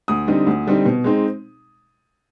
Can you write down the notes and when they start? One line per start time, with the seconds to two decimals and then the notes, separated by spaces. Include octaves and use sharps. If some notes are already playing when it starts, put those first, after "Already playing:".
0.08 D2 D#6
0.28 D3 G3 C4 D#4
0.47 D2
0.67 D3 G3 C4 D#4
0.86 B2
1.04 G#3 C4 D#4